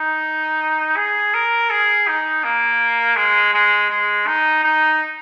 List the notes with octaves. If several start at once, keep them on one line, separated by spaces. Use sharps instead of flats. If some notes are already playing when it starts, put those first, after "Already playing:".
Already playing: D#4
G#4
A#4
G#4
D#4
A#3
G#3
G#3
G#3
D#4
D#4